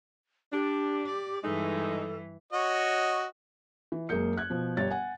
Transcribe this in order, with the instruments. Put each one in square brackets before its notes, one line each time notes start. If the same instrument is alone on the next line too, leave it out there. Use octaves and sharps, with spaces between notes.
[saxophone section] D4 [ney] G4
[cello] D5
[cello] G2 E3 [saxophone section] G#3 D#4 [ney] A4
[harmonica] F#4 C#5 D#5
[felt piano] E3
F#1 G#3 A#3 G#4 G6 C#7
F#6 G#6
B2 F3
G1 G4 C#5 A6
F#5 G#5